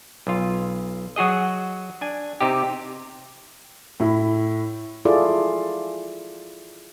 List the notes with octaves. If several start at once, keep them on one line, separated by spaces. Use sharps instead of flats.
B1 F4
F#3 F#4 G#4 D#5
D4 G#5
C3 D#4 G4
A2 E4
E4 F4 G#4 A4 D5